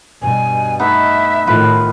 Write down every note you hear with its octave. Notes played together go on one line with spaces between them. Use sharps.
G2 B2 G#5
A3 B3 D#4 E5
A2 D#3 F4 B4